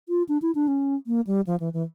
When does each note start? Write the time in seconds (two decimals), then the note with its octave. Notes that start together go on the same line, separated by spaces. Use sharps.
0.09 F4
0.29 D4
0.42 E4
0.55 D4
0.68 C#4
1.07 A#3
1.27 G3
1.47 F3
1.60 E3
1.73 E3